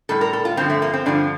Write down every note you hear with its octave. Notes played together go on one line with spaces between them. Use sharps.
A2 G3 A4
A#4
A4
F4
G2 D3 F3 C4
A3
A#3
C4
G2 D3 F3 D4